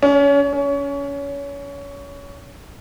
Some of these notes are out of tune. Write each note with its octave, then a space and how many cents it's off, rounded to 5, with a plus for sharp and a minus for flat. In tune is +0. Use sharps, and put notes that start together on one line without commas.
C#4 +30
C#4 +25